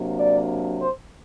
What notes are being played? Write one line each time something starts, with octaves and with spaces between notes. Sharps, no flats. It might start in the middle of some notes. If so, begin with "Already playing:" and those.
Already playing: C3 F#3 A#3 D4
D5
C5